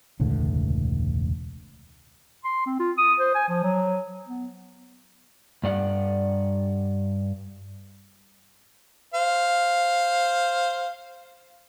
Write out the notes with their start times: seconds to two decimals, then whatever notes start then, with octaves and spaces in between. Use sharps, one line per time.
0.20 E1 C#2 A2 D3
2.44 C6
2.66 C4
2.79 F4
2.97 D#6
3.20 C5
3.35 G#5
3.48 F3
3.63 F#3
4.27 B3
5.63 G2 D5 F#5
9.14 C5 F5